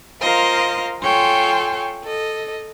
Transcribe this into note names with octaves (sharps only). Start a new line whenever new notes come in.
F4 A#4 C5 D#5 F5
F4 A4 C#5 G5 G#5 C6
A4 D#5